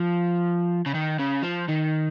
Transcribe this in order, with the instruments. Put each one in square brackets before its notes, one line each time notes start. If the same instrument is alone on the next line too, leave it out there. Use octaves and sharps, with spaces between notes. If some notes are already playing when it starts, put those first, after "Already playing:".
Already playing: [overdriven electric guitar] F3
C#3
D#3
C#3
F3
D#3